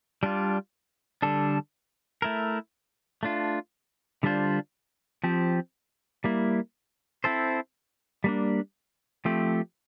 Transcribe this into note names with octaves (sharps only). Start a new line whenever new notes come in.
G3 D4 F4
D3 G3 D4 A4
A3 E4 A#4
A3 D4 F4
D3 G3 D4 F4 C5
F3 C4 G4
G3 A#3 E4
C4 E4 A4 C5
G3 A#3 D4
F3 A3 C4 G4